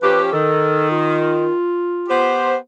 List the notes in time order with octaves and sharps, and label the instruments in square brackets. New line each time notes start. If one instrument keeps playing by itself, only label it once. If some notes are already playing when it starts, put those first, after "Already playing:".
[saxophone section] F3 C#4 G4 [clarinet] B4
[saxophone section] D#3 [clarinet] A4
[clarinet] F4
[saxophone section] B3 G4 C5